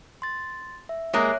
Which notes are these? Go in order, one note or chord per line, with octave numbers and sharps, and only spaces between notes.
C6 A6
E5
G#3 A#3 A#4 C#5 E5 F#6